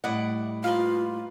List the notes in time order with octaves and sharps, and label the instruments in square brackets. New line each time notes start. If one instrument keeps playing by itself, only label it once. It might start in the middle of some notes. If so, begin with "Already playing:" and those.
[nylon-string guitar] A2 G3 D#5 [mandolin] E4 D5 F#5
[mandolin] A#3 B4 F5 [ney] F4